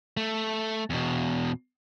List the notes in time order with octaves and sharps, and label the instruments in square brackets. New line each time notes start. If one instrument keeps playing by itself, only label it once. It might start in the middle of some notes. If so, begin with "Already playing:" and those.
[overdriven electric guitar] A3
E2 B2